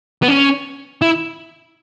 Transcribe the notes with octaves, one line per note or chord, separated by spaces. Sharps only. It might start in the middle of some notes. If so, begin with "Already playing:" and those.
B3
C#4
E4